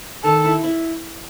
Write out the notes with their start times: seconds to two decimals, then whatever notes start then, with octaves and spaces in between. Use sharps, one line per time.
0.24 D#3 A4
0.44 E4
0.64 E4